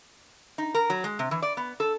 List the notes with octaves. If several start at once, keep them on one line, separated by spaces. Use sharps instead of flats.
D#4
A#4
F#3
G#3
C3
E3
D5
B3
A4